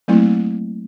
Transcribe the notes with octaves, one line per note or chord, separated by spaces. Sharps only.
F#3 A3 A#3 C4 E4